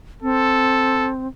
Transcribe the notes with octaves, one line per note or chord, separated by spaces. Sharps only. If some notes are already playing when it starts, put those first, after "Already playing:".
C4 A4